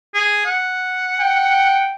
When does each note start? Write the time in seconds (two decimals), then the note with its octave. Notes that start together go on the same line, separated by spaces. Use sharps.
0.14 G#4
0.46 F#5
1.21 G5